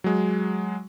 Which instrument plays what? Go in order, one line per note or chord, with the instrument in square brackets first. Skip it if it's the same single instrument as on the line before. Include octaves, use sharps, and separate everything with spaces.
[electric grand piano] F#3 G#3